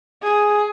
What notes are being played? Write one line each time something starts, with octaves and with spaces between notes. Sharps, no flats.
G#4